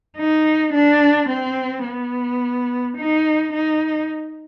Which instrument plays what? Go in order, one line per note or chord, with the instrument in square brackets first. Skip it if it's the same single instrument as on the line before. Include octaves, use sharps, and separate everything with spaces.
[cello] D#4
D4
C4
B3
D#4
D#4